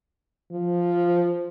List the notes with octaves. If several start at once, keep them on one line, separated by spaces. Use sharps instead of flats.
F3